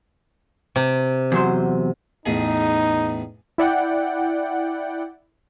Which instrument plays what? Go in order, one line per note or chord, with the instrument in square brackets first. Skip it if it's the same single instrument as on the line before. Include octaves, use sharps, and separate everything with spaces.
[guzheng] C3
[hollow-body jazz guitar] E2 F#3 C5
[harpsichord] A1 E2 G#4 [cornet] D#4
[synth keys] E4 D5 F#5 G5